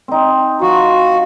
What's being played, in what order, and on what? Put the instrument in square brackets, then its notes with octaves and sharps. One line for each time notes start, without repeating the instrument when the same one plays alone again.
[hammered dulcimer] C4 D#4
[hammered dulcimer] F3 [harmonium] F#4